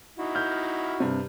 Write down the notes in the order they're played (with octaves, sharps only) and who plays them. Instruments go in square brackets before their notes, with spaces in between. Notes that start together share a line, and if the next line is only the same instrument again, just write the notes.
[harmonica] D#4 E4 F#4
[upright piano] F6 G6
G2 C3